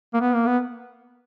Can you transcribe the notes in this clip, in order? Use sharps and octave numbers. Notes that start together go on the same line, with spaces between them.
A#3
B3
A#3
B3